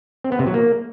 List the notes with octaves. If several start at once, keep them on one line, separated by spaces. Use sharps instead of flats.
C4
B3
C3
F#3
A#3